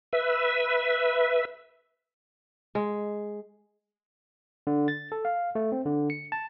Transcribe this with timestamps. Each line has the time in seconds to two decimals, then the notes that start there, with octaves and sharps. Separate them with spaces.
0.13 B4 E5
2.75 G#3
4.67 D3
4.88 A6
5.12 A4
5.25 F5
5.55 A3
5.72 C4
5.85 D3
6.10 C#7
6.32 A5